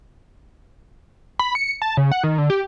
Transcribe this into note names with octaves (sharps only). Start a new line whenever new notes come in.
B5
C#7
A5
C#3
F#5
D#3
D3
G4